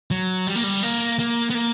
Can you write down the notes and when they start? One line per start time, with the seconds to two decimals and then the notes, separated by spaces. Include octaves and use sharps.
0.11 F#3
0.47 G3
0.56 A#3
0.63 G3
0.83 A#3
1.19 A#3
1.50 B3
1.55 A#3